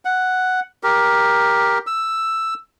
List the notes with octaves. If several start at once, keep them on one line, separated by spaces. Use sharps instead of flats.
F#5
G4 A#4
E6